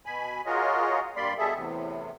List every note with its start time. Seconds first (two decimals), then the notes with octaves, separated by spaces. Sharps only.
0.06 B2 G#5 B5
0.46 F4 F#4 G#4 A#4 C#5 D#5
1.16 G2 G3 A#3 D5 B5 C6
1.38 B2 G3 G#4 A4 E5
1.54 E2 A2 C3